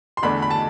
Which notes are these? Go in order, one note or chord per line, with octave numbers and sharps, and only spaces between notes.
C6
E2 D3 A3 D4 B5
B5
A5